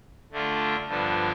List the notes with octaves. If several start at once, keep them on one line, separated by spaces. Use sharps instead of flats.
D3 A3 D4 F4
G2 D3 F3 B3 D4